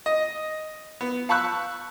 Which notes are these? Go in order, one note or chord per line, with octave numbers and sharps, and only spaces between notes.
D#5
B3
F5 A5 B5 C#6 E6 F#6